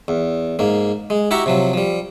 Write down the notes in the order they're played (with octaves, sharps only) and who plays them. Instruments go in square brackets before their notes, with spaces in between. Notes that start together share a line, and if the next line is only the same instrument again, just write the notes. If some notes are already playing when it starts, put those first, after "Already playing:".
[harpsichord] E2
G#2 A#3
G#3
E4 F#4 G4 E5 A#5 C#6
C3 F3 F#3
F3 G3